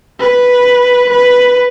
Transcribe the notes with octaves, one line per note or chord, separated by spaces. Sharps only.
B4
B4